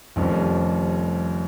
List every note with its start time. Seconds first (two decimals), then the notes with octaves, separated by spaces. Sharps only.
0.16 F1 F2 D#3 G3 C#4